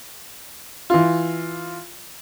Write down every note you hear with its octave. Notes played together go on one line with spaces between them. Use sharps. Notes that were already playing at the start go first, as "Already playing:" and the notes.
E3 F4